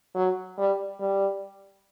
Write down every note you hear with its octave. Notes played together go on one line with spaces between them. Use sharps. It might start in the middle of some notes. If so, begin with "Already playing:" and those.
F#3
G3
G3